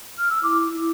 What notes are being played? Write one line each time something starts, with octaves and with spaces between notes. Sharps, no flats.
F6
E6
E4 D6
E4